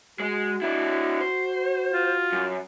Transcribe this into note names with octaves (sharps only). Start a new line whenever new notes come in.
G#3 F#4
D4 E4
C5
F4
F#2